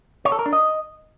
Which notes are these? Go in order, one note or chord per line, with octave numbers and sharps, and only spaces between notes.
C#5
A4
A#4
D4
D#5